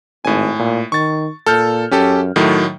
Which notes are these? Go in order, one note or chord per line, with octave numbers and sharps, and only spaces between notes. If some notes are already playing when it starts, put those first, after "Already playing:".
G#1 A2 G#5
A#2
D#3 C#6 A6
A#2 A4 F6 G6
F#2 C#4 G4 A4
A2 D#3 F#3 A3